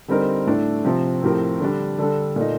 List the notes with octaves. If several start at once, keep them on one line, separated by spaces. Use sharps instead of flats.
D3 G3 C4 D#4 A#4
A2 A3 D4 A4
C3 F3 C4
A2 F3 C4 G4 A#4
D3 G3 D4
D3 G3 D4 A4
A#2 A3 D#4